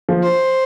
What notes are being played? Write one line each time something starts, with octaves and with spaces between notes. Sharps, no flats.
F3
C5